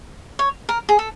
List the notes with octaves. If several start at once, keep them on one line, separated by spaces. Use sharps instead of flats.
C#5
A#4
G#4
A4